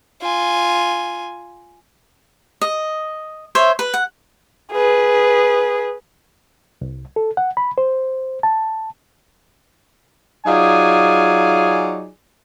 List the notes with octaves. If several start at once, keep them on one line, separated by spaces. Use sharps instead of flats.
F4 G#5
D#5
C5 C#5 E5
B4
F#5
G#4 B4
C2
A4
F#5
B5
C5
A5
F#3 D#4 F4 G#4 D5 G#5